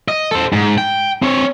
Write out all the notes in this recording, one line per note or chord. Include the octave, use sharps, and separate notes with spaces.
D#5
A4 C5
G#2
G5
C4 C#5